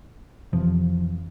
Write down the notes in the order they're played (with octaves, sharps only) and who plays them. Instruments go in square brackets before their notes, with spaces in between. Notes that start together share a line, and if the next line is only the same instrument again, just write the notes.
[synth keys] F2 C3 E3 [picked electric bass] F3